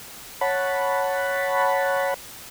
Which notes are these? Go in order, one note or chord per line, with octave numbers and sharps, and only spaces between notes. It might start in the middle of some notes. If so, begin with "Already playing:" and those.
C#5 F#5 A5 B5